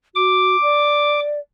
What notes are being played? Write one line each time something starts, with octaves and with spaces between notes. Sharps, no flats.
F#4 D6
D5